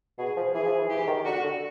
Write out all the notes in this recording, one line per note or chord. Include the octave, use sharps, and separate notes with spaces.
B2 G#4
F3
E3 G#4
F3
E3
E3 G4
D#3
D3 F#4
D3